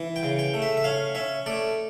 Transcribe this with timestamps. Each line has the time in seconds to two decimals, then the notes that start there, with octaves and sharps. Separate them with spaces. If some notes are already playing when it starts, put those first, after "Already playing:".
Already playing: E3
0.16 G5
0.23 C#3
0.39 G5
0.54 A3
0.62 E5
0.77 E5
0.84 C#4 F5
1.15 C#4 E5
1.46 A3 D5